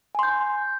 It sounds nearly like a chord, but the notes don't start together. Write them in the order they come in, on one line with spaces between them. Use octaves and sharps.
G#5 C6 G6